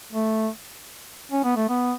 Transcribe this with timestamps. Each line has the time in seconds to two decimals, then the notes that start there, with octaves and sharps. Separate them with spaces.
0.13 A3
1.32 C#4
1.44 B3
1.56 A3
1.69 B3